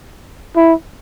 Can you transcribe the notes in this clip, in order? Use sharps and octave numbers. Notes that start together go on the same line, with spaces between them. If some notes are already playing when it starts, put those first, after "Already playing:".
E4